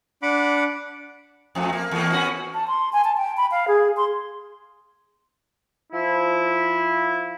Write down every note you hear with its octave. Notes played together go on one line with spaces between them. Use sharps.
D4 F#5 B5 D6
F2 F3 A3
A#3
E2 A#3
B3 C#4 F#4
A5
C6
G#5
A5
G5
B5
F5
G#4
C6
F3 E4